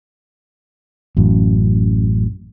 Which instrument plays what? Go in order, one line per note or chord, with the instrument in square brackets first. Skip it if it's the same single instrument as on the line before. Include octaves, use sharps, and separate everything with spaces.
[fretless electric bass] A1 F#2